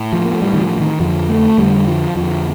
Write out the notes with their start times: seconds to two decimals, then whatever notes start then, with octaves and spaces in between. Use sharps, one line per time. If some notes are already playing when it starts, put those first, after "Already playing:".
Already playing: A2
0.13 F3
0.25 A#3
0.33 A3
0.42 A2 G3
0.53 D#3
0.62 F3
0.76 F3
0.80 D#3
1.00 F2 D3 F3
1.29 A3
1.58 F2 D3 G3
1.87 F3
2.16 F2 D3 F3